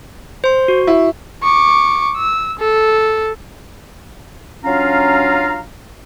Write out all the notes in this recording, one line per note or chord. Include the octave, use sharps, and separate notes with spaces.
C5 C6
F#4
E4
C#6 D6
E6
A4
F#3 C#4 D4 F4 F5 A#5